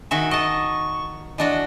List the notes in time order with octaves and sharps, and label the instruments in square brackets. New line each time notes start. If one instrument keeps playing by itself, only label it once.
[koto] D#3 F#4 E5 [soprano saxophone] G#5
[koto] D#5 A5 [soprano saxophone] C#6
[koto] E3 D4 F#4 [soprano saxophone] D#5